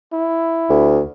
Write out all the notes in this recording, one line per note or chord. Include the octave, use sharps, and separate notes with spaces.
E4
D2